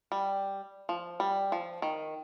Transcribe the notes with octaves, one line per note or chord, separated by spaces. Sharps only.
G3
F3
G3
F3
D#3